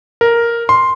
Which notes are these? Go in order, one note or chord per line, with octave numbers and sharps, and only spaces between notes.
A#4
C6